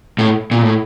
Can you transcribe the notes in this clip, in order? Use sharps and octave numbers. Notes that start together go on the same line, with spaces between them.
A2
A#2
A2